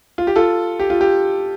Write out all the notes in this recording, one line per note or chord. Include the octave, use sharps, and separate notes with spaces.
F4
G4
F4 A4
G4
F4
G4